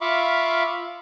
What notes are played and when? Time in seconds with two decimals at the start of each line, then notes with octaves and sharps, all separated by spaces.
0.01 F4 E5 F5 B5 C#6 D6